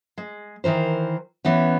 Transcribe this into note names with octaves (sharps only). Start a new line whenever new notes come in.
G#3
D#3 E3 A#4 C5
E3 B3 C#4